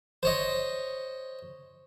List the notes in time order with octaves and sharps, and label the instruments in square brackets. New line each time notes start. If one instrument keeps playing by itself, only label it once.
[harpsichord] C5 C#5 D#5